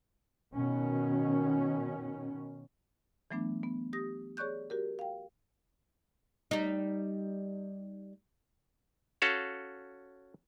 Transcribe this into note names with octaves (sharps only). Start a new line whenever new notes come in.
B2 D#3 C#4
E3 F#3 A3 B3 D4
B3
G4 D#6 A#6
G#4 C#5 D5 C#6 F#6 G6
F#4 G4 A#4
F5 G5
G3 D#4
C#4 F#4 A4 F5